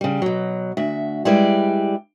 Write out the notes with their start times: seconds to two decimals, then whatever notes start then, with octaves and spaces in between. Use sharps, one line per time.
0.01 C#3 G3
0.22 B2 F#3
0.77 D2 F#4 E5
1.25 G3 G#3 E4 B4 D5